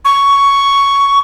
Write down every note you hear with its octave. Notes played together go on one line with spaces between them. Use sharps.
C#6